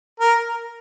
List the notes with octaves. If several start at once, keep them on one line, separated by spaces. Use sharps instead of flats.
A#4